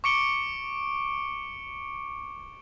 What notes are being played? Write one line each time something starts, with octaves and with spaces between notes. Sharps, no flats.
C#6 D6 C#7 D7 G7